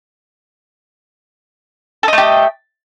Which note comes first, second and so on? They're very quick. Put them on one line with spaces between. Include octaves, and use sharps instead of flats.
A4 D#5 A3 G4